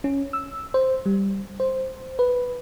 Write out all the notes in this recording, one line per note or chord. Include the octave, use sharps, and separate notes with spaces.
C#4
E6
C5
G3
C5
B4